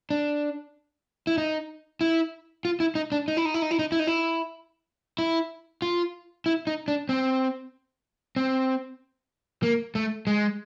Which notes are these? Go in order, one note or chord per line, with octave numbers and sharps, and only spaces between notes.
D4
E4
D#4
E4
F4
E4
D#4
D4
D#4
E4
D#4
E4
D#4
E4
D#4
E4
D#4
E4
E4
F4
E4
D#4
D4
C4
C4
A#3
A3
G#3